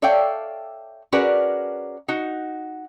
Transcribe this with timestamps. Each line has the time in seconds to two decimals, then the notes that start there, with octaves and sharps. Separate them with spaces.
0.02 A4 C#5 D5 E5 F5 G5
1.12 C#4 F#4 G#4 A#4 B4 D5
2.08 D#4 F#4